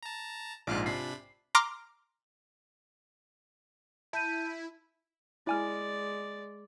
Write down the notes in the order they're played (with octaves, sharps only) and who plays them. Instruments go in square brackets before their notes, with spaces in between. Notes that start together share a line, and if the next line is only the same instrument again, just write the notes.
[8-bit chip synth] A5 A#5
[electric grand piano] A#1 G#2 [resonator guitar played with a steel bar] G#3 F4 D5 [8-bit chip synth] D6 F6 F#6
[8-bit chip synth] C3 D4 B5 [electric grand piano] C7
[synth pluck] A#5 C6 D6 F6
[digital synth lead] E4 [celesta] A5 G6 D#7
[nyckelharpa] G#3 D5 [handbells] E4 G#5 F6